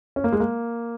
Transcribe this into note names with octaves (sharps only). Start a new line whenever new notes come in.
C#4
A#3
G#3
A#3